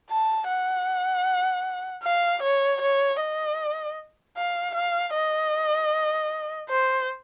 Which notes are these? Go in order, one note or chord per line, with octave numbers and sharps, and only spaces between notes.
A5
F#5
F5
C#5
C#5
D#5
F5
F5
D#5
C5